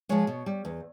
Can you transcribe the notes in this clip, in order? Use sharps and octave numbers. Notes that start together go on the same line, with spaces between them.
F3 G#3 C#5
B2
G3
E2